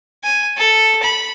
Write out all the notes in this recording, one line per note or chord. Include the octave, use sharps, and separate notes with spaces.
G#5
A4
B5